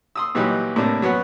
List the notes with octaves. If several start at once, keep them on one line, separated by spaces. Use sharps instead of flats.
C6 D#6 E6
A#2 E3 F#3 G3 D#4 G4
A2 C3 A#3 D4
F#3 B3 C#4 F#4